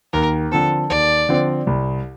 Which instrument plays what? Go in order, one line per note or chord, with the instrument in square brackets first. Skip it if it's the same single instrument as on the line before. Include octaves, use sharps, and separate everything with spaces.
[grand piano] D#2 [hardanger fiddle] A#4
[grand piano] D3 F3 C4 [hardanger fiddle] A4
[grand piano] D#2 [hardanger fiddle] D5
[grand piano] D3 F3 C4
C2